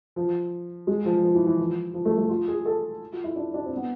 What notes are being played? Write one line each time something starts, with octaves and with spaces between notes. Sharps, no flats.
F3
G#3
F3
F3
E3
E3
F3
F3
A3
A3
F4
G#4
A4
F4
E4
D4
D4
C4
B3